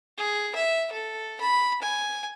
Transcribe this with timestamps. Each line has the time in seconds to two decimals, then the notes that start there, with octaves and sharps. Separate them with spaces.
0.18 G#4
0.55 E5
0.92 A4
1.41 B5
1.82 G#5